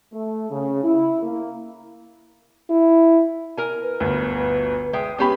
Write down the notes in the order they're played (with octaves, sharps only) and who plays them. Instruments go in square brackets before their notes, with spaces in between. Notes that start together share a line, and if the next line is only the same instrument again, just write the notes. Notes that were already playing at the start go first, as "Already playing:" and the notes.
[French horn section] A3
C#3
E4
A#3
[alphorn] E4
[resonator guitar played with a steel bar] A#4 G#5
[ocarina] B4
[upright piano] G1 D2
[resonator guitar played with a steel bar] G#3 E5 G5 [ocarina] D#6
[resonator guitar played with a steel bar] G#3 B3 B4 [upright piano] C#4 G4 B5 [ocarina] C#6